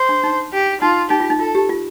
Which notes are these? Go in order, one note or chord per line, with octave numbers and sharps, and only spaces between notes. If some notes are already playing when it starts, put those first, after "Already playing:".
Already playing: C5
D4
D#4
G4
D#4 F4
D#4 G4
F4
D#4
F4 A4
G4
F4